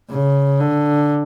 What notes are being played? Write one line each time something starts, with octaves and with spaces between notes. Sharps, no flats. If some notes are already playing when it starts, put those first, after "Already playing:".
C#3
D3